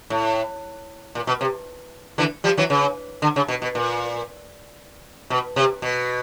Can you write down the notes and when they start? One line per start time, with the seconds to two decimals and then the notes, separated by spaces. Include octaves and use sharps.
0.10 A2
1.15 A#2
1.27 B2
1.41 C3
2.18 D3 E3
2.44 F3 G3
2.57 E3 F#3
2.70 C#3
3.22 D3
3.36 C#3
3.48 B2
3.62 B2
3.75 A#2
5.30 B2
5.56 C3
5.82 B2